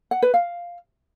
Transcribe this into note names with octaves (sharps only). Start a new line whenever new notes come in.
F#5
B4
F5